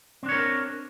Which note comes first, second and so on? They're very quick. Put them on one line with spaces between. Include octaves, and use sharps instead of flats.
C4 D4 C#5 A#4